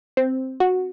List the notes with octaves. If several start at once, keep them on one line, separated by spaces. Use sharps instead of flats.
C4
F#4